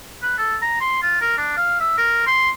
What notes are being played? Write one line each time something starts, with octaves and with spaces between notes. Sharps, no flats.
B4
A4
A#5
C6
F4
A#4
D4
F5
E5
A#4
C6